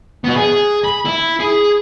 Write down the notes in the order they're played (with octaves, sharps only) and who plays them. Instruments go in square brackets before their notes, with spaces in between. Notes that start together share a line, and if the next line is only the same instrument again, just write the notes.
[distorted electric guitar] B3 F#4
G#4
B5
E4
G#4